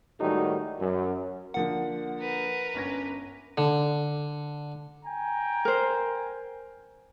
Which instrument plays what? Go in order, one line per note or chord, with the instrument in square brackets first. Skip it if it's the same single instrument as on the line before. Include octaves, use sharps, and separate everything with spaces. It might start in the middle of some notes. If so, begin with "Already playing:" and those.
[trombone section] A2 D#3 G3 G#3 D#4 F#4
F#2
[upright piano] D3 F3 A#3 [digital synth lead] F#5
[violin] A#4 B4
[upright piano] G1 C#4 A#6
[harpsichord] D3
[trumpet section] G5 G#5 A#5
[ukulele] A#4 C5